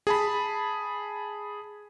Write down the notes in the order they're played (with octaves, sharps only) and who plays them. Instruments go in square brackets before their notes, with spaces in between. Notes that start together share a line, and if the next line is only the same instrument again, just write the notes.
[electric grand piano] G#4 A5 B5